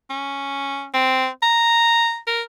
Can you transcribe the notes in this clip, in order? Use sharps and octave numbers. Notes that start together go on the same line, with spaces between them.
C#4
C4
A#5
A#4